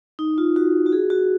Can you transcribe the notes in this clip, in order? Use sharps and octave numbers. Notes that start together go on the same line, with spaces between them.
D#4
F4
F#4
F#4
G#4
F#4